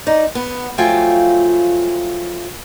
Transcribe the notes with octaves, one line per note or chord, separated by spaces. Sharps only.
D#4 D5
B3
F3 F#3 A3 F4 G5 G#5